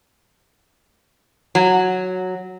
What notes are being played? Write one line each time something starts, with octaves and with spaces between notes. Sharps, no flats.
F#3